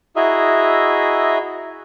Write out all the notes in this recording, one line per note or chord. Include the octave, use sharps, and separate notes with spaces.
E4 F#4 G#4 D#5 E5 A#5